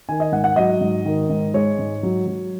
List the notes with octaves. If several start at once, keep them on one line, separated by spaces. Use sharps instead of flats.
D#3 G#5
D#5
G#2 F#5
F#5
F#3 D#5
G#2
D#3
G#2
G#3 C#5
G#2
F#3
F#3